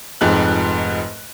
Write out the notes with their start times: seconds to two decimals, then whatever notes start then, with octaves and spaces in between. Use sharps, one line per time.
0.21 F1 F2 G#2 F#6